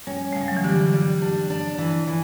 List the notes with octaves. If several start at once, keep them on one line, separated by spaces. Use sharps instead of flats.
G3 C#4
A3
C#3
G3
F#3
E3
D3 G3
G3
D4
D4
E3
E3